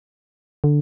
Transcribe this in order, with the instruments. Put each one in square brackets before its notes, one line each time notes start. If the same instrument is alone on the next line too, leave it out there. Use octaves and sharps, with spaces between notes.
[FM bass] D3